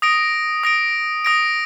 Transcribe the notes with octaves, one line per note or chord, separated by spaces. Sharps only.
D#6 A#6 D7
D#6 A#6 D7
D#6 A#6 D7